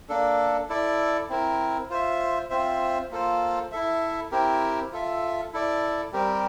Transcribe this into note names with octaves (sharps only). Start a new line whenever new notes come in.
A#3 D4 A4
E4 A4 D5
C4 E4 A#4
F4 C5 E5
C4 F4 C5 E5
A#3 F4 A4 C5
E4 A4 E5
C4 E4 G4 A#4
F4 A4 E5
E4 A4 D5
G3 C4 G4 A#4